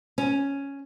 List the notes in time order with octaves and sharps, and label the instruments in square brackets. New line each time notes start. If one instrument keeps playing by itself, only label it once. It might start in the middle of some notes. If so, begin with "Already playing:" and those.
[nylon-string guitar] C#4